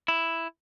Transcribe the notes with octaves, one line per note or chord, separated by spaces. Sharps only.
E4